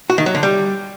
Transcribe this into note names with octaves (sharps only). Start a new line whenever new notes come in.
F#4
D#3
F#3
D3
G3